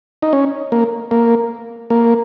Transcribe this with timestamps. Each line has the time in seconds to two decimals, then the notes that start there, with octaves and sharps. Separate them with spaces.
0.22 D#4
0.33 C#4
0.72 A#3
1.11 A#3
1.90 A#3